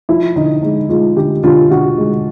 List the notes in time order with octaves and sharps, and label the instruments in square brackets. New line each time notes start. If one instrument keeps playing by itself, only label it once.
[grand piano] F3 E4
D3 D#4
G#3 D#4
G#3 F4
D3 G4
D3 F4
D3 F#4
G#3